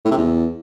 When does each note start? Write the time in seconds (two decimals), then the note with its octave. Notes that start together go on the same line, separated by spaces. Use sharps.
0.05 A2
0.11 C3
0.17 E2